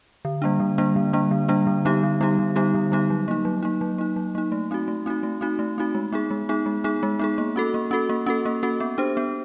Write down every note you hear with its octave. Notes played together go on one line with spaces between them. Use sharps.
D3
G3 A#3 D4
D3
G3 A#3 D4
D3
G3 A#3 D4
D3
G3 A#3 D4
D3
G3 B3 D#4 G4
D3
G3 B3 D#4 G4
D3
G3 B3 D#4 G4
D3
G3 B3 D#4 G4
F#3
A#3 D#4
F#3
A#3 D#4
F#3
A#3 D#4
F#3
A#3 D#4
A3
C4 D#4 F#4
A3
C4 D#4 F#4
A3
C4 D#4 F#4
A3
C4 D#4 F#4
G#3
B3 D#4 G#4
G#3
B3 D#4 G#4
G#3
B3 D#4 G#4
G#3
B3 D#4 G#4
A#3
C#4 F#4 A4
A#3
C#4 F#4 A4
A#3
C#4 F#4 A4
A#3
C#4 F#4 A4
B3
D4 G4 C5
B3